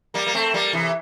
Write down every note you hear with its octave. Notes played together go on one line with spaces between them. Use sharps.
G3 A#3
A#3
A3 C4
G3 A#3
C3 E3